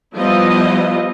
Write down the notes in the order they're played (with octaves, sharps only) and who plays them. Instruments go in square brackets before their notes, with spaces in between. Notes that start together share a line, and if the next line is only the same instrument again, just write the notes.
[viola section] F3 G3 B3 E4 D#5 F5